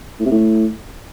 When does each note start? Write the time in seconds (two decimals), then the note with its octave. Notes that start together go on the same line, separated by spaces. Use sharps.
0.20 A2
0.26 C3
0.31 A2